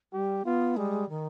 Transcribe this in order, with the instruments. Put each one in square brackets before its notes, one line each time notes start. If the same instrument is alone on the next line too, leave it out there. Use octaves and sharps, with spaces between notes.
[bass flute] G3 [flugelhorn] G4
[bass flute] B3 [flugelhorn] F4
[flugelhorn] G3 [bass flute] G#3
[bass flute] D#3